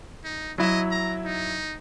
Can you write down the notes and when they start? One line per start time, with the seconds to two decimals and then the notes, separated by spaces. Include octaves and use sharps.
0.24 D#4
0.58 F#3 E4 D#5 E5
0.91 A#5
1.25 D#4